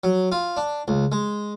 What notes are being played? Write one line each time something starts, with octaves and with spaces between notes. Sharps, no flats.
F#3
F4
D4
C#2
G#3